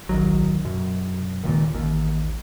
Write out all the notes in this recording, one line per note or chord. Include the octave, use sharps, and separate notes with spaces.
D1 A#1 D#3 F#3
F#2 B2
D#1 C#2 A#2 D#3
A1 D#2